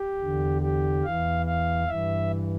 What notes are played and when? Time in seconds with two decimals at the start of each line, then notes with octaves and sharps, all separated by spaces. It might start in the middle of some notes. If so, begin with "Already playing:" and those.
Already playing: G4
0.20 E2 D3
0.62 G4
1.04 E2 E3 F5
1.46 F5
1.88 G2 E3 E5